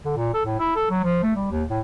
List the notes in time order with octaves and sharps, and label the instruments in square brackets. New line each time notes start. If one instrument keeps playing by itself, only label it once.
[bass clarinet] D3
A#2
A4
A2
E4
A4
F#3
F3
A3
G3
D#2
A2